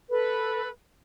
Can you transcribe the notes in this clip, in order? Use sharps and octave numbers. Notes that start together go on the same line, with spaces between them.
A4 B4